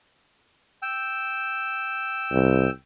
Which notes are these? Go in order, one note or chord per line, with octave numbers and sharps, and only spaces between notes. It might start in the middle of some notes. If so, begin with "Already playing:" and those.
G5 E6
C2